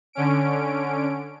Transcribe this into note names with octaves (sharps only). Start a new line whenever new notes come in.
D3 C#4 D7